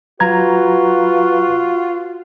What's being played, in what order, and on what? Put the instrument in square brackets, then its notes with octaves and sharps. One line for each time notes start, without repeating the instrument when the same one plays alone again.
[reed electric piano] F#3 A#5 G#6 [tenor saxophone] F4 [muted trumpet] F#4 [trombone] B4